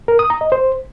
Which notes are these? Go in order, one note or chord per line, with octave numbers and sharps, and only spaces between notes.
A#4
D#6
A#5
D#5
C5